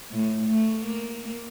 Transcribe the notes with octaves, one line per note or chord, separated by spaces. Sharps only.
A2
A3
A#3